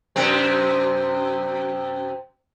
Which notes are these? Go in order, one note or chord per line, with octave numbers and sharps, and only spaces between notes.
F#2 C3 C4